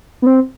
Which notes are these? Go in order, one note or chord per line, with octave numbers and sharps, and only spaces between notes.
B3
C4